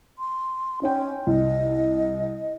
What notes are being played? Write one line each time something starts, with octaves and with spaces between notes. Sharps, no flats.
C6
C#4 D#4 C#5 G5
C2 D#5